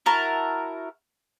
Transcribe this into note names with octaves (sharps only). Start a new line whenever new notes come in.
E4 F#4 A#4 A5